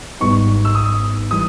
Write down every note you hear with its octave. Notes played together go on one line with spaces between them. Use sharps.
G#1 G#2 G3 B3 D#4 C#6
E6
D#6
E3 G3 D#6